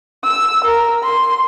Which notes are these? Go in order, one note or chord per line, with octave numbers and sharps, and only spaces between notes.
E6
A#4
C6